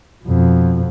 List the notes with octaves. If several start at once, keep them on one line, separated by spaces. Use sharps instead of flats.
F2 B2